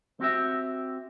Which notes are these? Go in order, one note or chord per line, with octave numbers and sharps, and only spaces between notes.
C4 F#4 G4 E5